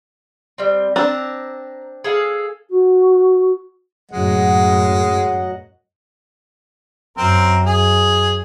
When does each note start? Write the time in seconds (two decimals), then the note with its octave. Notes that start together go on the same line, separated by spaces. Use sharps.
0.58 G3 C4
0.96 C4 D4 A#5
2.04 G#4 A4 F5
2.69 F#4
4.11 F#2 A2 C#3 F#3 G#3 D#5 F#5
7.18 F#2 C4 A#4
7.66 G#4